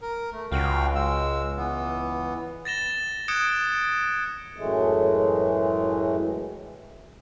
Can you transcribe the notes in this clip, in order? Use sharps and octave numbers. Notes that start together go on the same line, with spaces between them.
A#4
A3
C#2 F#4 F5 G5
G#3 E6
E3 B3
A6 A#6 E7 G7
D#6 F#6 G#6 C#7 D7 E7
F#2 A2 E3 G#3 A3